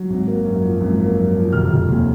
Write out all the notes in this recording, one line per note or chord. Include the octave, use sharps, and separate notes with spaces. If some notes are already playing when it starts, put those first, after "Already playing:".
Already playing: F#3
G#1
A#3
F#2
F3
G#1
A#3
F#2
F3
F1 F6
F1
D#2